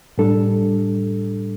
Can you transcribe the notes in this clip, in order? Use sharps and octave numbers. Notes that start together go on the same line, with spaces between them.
A2 G3 D4 A4